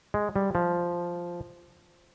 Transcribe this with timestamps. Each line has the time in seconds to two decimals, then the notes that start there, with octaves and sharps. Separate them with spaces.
0.14 G#3
0.36 G3
0.55 F3